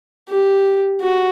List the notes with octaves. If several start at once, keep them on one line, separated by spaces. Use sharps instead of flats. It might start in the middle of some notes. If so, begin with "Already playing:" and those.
G4
F#4